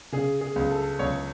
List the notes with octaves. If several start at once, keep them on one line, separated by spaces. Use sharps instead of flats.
C#3 G#4
G#4
C#2
A4
C#2 C#5